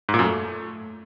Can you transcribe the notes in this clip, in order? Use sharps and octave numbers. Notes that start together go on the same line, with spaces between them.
G#2
A#2
F#2
A3